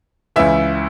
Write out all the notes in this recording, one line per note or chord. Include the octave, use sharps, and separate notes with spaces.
C#2 C#3 E3 E5 E6